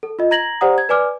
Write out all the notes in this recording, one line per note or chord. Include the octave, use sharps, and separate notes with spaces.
A4
F4 D#5
A#5 G#6 A#6 F#7
G4 C5 D5 F#5 A#5 D#6
G#6
B4 D5 G#5 D6 F6